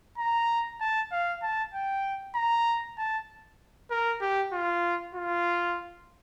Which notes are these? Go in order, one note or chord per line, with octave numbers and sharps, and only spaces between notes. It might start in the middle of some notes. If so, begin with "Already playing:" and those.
A#5
A5
F5
A5
G5
A#5
A5
A#4
G4
F4
F4